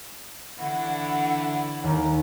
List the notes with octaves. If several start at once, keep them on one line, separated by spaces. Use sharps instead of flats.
D3 E3 D4 E4 F#5
D#2 A#5